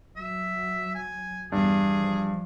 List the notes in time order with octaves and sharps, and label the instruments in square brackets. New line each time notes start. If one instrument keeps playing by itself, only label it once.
[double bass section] F#3 [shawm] E5
[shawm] G#5
[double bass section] E2 [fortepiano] G2 [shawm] G#4
[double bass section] F3